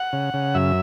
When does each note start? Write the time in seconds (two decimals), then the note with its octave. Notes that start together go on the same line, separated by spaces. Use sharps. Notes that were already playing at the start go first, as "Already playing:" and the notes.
Already playing: F#5
0.13 C#3
0.34 C#3
0.55 F#2 E5